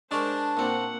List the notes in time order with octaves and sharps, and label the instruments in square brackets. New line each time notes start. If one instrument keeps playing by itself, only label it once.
[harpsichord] G#3 A#4 [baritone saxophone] D4 [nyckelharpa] C5 [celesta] A5 C#6
[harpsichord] A#2 C4 [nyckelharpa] A#3 F#5